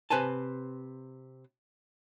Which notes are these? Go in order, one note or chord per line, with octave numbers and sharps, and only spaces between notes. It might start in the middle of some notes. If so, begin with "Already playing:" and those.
C3 B4 C5 G#5 A5